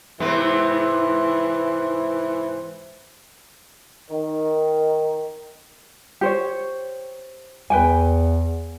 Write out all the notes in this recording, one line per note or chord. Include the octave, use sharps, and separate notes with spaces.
G#2 C3 E3 B3
D#3
G4 C5 C#5
E2 B4 G5 G#5